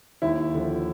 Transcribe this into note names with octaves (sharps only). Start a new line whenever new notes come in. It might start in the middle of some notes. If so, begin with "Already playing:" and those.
D#2 E4
D3 F3